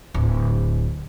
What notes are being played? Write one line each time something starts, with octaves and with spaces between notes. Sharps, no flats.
D1